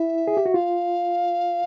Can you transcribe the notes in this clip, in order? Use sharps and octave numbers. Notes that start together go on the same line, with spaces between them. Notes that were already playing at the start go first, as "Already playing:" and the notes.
Already playing: E4 E5
G#4
G4
F#4
F4 F5